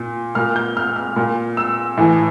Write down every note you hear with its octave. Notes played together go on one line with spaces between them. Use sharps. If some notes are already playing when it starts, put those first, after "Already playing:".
Already playing: A#2
A#2 F6
G6
F6
F6
A#2
E6
A2 E3